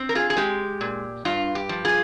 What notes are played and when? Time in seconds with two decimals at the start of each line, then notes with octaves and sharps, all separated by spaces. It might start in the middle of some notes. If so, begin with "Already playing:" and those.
Already playing: C4
0.09 A#4
0.15 F4 G#4
0.30 G#4
0.37 G#3 G4
0.81 A#2
1.25 G2 F4
1.55 G4
1.69 F3
1.85 F4 G#4